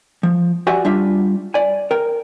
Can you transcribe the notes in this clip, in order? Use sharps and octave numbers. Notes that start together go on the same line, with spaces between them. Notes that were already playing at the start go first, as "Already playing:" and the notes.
F3
F#4 G4 D5 E5 F#5 G#5
G3 D4 F4 E5
D5 G#5
A#4 G5